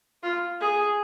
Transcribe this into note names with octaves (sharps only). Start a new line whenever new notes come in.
F4
G#4